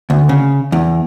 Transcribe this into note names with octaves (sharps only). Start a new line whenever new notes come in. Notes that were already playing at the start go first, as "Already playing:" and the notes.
D2
C#3
E2